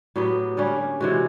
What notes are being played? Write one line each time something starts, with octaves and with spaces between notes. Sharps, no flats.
A2 F#3 B3 G4
D3 G3 A#3 C#4
C3 E3 G#3 F#4